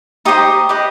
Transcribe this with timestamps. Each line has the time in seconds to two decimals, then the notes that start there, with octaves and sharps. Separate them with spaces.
0.25 D#4 G4 C5 D#5 D#6
0.69 G4 B4 D#5